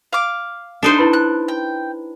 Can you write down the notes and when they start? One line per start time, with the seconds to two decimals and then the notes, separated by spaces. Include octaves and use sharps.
0.13 F5 D6
0.83 D4 D#4 C5
0.98 E4 B4 B5
1.13 F#6
1.48 G5